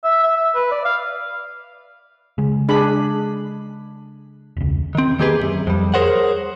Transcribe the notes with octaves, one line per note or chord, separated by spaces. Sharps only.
E5
E5
E5
B4
D5
F5
C#3 G#3
D4 G#4 B5
E1 C#2
D#3 C4
D#3 A#3 G4 G#4 B4
B1 F#2
F2 G3
G#4 A#4 C5 C#5 F#5